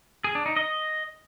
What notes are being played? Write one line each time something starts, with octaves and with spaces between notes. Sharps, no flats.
G#4
D4
D#4
D#5